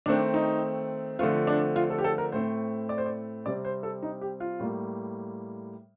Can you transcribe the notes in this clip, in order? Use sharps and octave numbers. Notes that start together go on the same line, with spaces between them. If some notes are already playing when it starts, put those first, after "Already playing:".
D#3 A3 C4 D4
D#4
D3 F3 A3 C4 F4
D4
F4
A4
G4
A4
A#4
A2 A3 C4 C5
D5
C5
D5
C3 G3 C4 D5
C5
A4
D#4
G4
F4
A2 G3 A#3